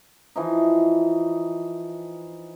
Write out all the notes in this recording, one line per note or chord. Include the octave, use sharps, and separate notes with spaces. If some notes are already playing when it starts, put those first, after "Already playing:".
E3 F3 D#4